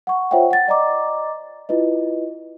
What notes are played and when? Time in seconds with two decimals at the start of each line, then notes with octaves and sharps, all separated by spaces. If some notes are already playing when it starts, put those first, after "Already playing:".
0.07 F#5 C#6
0.31 F4 C5 C#5 E5 F#5 G5
0.50 F#5 A6
0.68 D5 D#5 A#5 D6
1.69 E4 F4 B4 D#5